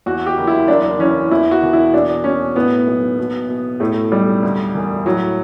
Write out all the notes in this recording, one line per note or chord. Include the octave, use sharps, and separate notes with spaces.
E2 F#4
G4
F#1
E4
F#2 D4
E3 C#4
E2 E4
F#4
E1
E4
B2 D4
B2 C#4
A2 B3
B1
B2
B2
A2 A3
B1 G3
D2
E1
A2 F#3